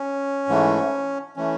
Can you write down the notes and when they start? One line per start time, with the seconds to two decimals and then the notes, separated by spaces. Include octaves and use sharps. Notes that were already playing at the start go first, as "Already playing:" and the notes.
Already playing: C#4
0.48 G#2 E3 A3
1.37 E3 A3 C#4